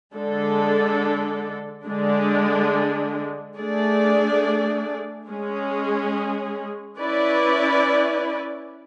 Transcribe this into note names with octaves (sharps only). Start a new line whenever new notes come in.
D3 G#3 D4 A4
D3 G#3 D4
A3 D4 G#4 D5
G#3 C#4 G#4
C#4 E4 B4 D5